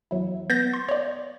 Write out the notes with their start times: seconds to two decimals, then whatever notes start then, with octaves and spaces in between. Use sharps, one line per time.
0.11 E2 F#3 E4
0.50 B3 G6 A6 A#6
0.74 C6
0.89 C#5 D5